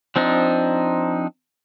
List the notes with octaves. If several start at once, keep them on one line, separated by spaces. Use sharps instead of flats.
F3 C4 D4 D#4